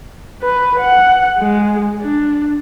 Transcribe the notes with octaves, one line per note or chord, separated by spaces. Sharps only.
B4
F#5
G#3
D4